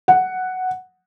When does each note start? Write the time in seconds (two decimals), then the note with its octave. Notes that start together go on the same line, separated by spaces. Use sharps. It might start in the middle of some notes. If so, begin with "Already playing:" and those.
0.08 F#5